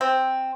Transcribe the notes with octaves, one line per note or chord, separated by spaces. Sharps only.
C4